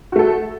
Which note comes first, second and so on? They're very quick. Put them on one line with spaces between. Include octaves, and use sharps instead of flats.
F#4 A3 A4